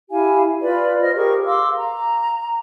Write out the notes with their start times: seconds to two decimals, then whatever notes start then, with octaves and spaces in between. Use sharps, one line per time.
0.11 E4 G4 F5 G#5
0.61 F4 B4 D5 B5
1.01 C5 D#5 F6
1.15 G4 G#4 A#4 C#6
1.46 F5 C6 D6 E6
1.77 A#5